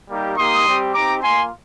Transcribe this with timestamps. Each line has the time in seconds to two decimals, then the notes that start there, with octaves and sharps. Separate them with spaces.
0.10 G3 A#3 D#4 G4
0.38 A#3 D#4 G4 C6 D#6
0.66 G3 C4 G4
0.94 C4 D#4 G4 A#5 D6
1.23 A#3 F4 G#5 C6